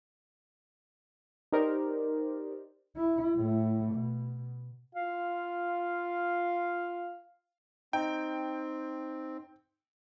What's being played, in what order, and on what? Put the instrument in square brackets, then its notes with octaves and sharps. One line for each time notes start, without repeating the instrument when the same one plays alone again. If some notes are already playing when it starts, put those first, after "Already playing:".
[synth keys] D#4 G4 A#4 C5 D5
[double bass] E4
A2 A3
B2
[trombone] F4 [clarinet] F5
[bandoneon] C4 [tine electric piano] D#4 [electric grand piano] G5